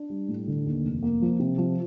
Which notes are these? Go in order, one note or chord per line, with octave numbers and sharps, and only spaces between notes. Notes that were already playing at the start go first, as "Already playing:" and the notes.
Already playing: D4
G3
A2
D3
D#2
F1
A#3
F3
C3
F3